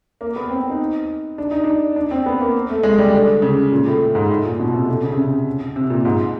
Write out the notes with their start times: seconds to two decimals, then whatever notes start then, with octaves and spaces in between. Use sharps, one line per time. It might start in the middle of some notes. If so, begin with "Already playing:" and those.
0.21 A#3
0.36 B3
0.50 C4
0.70 D#4
1.38 D4
1.51 D#4
1.64 D4
1.96 D4
2.11 C4
2.26 B3
2.41 A#3
2.70 A3
2.83 G#3
2.98 G3
3.13 D3
3.42 C#3
3.72 A#2
3.87 A2
4.15 G#2
4.30 A2
4.45 A#2
4.60 B2
4.74 C3
4.89 D3
5.03 C#3
5.12 C3
5.18 C#3
5.76 C3
5.90 A#2
6.05 G#2